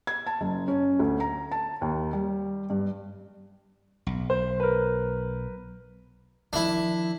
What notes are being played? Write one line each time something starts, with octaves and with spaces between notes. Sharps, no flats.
G#6
A5
F#1
C#4
D2
A#5
A5
D#2
G3
G2
B1
C5
A#4 B4
D#3 F3 D4 E4